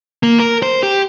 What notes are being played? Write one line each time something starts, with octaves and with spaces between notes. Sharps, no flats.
A#3
A#4
C5
G4